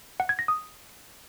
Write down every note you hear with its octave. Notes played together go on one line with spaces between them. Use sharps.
F#5
G#6
A#6
D#6